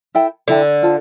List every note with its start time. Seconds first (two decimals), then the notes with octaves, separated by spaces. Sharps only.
0.15 E4 A4 E5 G5
0.48 D3 E4 A4 E5 G5
0.83 F4 C5 F5 A5